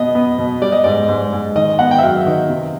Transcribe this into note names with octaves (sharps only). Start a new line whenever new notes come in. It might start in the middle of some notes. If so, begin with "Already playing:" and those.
Already playing: B2 B3 D#5
B3
B2
G3 D5
D#5
G#2 D5
G#2
G#2
D#3 D#5
B3 F#5
G5
E5
F#3 F5
D#3
C3